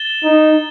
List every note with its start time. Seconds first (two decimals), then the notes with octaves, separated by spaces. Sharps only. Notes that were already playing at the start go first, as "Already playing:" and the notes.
Already playing: A6 E7 G7
0.24 D#4